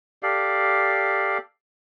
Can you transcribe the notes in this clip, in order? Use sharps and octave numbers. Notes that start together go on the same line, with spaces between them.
G4 A4 D5 F5